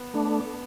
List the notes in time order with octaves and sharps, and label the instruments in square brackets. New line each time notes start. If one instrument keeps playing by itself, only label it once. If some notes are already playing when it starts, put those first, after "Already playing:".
Already playing: [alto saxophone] B3
[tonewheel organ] A3 D4